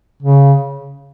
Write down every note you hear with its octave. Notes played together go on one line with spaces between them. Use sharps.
C#3